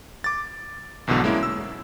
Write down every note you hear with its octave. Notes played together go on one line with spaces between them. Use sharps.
D6 A6
B1 E2 G#2 B2 D3
G#3 A#3 C#4 E4
E6